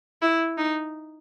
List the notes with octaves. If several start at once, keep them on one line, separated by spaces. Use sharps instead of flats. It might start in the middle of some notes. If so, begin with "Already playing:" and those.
E4
D#4